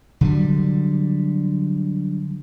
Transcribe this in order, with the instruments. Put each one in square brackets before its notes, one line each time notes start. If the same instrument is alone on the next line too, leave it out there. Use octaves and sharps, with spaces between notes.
[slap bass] D3 F#3 G3